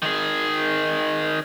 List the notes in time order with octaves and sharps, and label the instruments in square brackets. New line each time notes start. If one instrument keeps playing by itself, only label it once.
[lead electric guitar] D#3 G#4